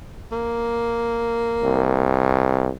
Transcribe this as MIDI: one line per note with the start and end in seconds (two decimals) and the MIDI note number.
0.32 2.21 58
1.64 2.70 36